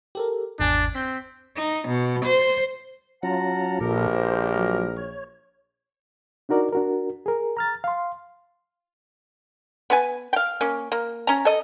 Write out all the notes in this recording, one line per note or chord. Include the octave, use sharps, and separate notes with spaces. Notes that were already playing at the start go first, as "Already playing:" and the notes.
G4 A4 A#4
G#1 E2 D4 G#5
C4 G6 B6
D#4
B2
C5
F#3 C#4 F4 F#5 A5 A#5
A#1 A#2 F3 G4 A4 A#4
C5
F#3
C#5
D4 D#4 F#4 A#4 D5
D4 F#4 A#4
G#4 A#4
A#5 F6 A6
F5 C6
B3 B4 G#5
F5 G5
A#3 C#4
A#3
C#4 A#5
A4 D#5